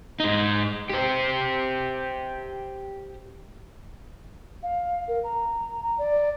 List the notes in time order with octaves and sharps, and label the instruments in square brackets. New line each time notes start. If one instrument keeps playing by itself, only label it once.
[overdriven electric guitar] G#2 D#4
G4 C5
[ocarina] F5
A#4
A#5
A#5
D5